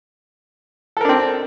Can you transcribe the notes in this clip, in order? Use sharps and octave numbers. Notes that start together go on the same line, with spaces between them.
C4 D4 A4 A#4